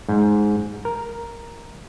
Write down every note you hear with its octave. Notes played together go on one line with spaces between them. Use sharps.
G#2
A#4